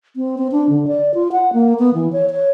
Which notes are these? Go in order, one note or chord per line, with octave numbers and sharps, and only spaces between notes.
C4
C4
D4
D3
D5
F4
F#5
A#3
B3
E3
C#5
C#5